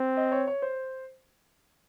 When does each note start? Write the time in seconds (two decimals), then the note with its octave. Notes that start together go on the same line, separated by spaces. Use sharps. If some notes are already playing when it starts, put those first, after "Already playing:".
Already playing: C4
0.17 D#5
0.32 C#5
0.48 C#5
0.62 C5